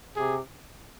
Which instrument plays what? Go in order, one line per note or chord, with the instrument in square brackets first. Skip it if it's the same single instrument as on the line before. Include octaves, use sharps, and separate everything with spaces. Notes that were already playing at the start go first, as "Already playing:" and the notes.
[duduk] C3 [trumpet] G#4